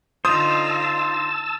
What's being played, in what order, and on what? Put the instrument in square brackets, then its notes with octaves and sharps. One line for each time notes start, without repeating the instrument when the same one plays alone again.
[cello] D3 F4 [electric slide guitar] D#4 C5 [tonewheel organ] A5 E6 [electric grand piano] D#6